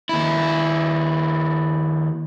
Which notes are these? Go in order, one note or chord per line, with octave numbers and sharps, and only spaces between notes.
D#2 E4